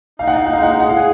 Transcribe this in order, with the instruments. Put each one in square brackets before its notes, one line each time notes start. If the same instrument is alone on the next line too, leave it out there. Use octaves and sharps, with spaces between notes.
[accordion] D#4 [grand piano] F5
[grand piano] F#5
F5
F#5
[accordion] G#3 [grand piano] F5
[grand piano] F#5
F5
F#5
F5
[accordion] G#4 [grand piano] F#5